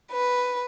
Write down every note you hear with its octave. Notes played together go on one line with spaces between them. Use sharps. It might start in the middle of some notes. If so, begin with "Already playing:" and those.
B4